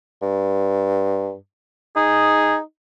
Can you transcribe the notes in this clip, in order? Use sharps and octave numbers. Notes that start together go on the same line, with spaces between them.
G2
D#4 G#4